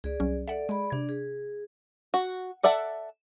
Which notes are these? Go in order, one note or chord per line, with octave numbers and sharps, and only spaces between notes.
C#2 G#4 D5
C2 F#3 C#4
A4 D5 E5 F#5
G#3 G#4 D5 B5
C3 D4 D5 G#6
G#4
F#4
A4 D5 E5 F#5 A5